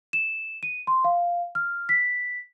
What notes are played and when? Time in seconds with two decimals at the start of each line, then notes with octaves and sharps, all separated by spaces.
0.13 E7
0.63 D#7
0.87 C6
1.05 F5
1.55 F6
1.89 B6